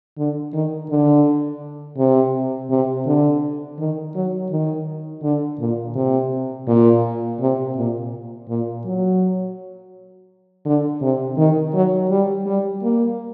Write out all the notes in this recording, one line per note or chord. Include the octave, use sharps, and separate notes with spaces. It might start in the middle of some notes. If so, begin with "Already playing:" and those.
D3
D#3
D3
C3
C3
D3
D#3
F#3
D#3
D3
A#2
C3
A#2
C3
A#2
A#2
F#3
D3
C3
D#3
F#3
G3
G3
A#3